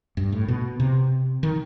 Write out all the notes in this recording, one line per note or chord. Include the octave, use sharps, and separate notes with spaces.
G2
A2
B2
C3
D#3